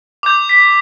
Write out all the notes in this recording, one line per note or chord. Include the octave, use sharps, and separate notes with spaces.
D6 G6
B6